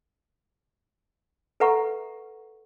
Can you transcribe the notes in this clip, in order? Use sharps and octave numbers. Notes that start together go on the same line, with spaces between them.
A4 B4 E5 F#5 A#5 C#6